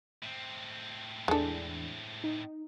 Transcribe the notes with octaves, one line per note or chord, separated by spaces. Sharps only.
A2 C4
E2 E3 G#3 D4 A4
D#4